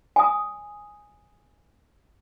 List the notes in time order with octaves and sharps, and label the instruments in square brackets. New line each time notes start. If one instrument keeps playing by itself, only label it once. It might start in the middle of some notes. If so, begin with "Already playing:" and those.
[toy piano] G#5 D#6